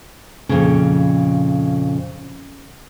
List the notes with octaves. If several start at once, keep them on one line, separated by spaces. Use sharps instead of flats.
F2 A#2 C#3